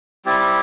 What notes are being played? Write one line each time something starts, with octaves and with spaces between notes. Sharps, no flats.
G3 C4 E4 G4